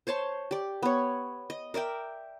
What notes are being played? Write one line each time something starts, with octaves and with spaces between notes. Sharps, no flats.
C5 C#5 A5 C6
G4 D5
B3 C#5
D#5
A#4 D5 E5 G5